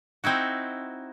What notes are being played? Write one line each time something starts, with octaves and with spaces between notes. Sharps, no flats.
C4 D#4 E4 F#4